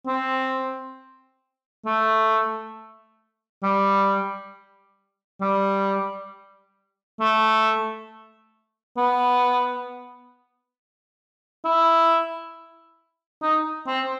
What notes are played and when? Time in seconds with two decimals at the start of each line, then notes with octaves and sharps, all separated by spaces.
0.07 C4
1.86 A3
3.63 G3
5.41 G3
7.20 A3
8.97 B3
11.65 E4
13.42 D#4
13.87 C4